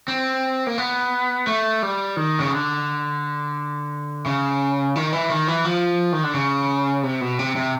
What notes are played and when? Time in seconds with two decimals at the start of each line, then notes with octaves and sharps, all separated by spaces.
0.08 C4
0.67 A#3
0.78 B3
1.47 A3
1.82 G3
2.17 D#3
2.40 C#3
2.52 D3
4.26 C#3
4.95 D#3
5.13 E3
5.30 D#3
5.48 E3
5.65 F3
6.13 D#3
6.24 D3
6.34 C#3
7.03 C3
7.21 B2
7.39 C3
7.56 C3